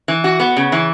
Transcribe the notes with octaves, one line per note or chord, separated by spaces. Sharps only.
E3
F#4
B3
C#3
E3